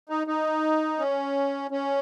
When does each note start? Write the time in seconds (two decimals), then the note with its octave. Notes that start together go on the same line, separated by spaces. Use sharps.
0.09 D#4
0.27 D#4
0.99 C#4
1.71 C#4